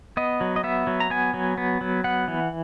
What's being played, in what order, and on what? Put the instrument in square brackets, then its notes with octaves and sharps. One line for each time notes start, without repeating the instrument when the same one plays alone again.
[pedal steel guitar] B3 D#5
F#3
D#5
B3 E5
F#3
A#5
B3 G#5
F#3
B3
F#3
B3 F#5
E3